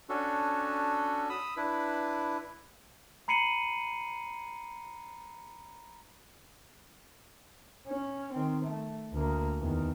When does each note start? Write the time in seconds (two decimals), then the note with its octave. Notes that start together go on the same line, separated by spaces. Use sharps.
0.09 C#4 D4 F#4 A4
1.30 B5 D#6 E6
1.57 D4 E4 B4
3.28 A#5 B5 C7 C#7 D#7 F#7
7.88 C#4
8.33 D#3 C4
8.65 A3
9.13 D2 A#3
9.61 E2 D#3